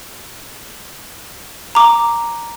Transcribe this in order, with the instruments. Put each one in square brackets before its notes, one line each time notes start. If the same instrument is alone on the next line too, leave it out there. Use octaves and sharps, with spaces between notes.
[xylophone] A#5 D6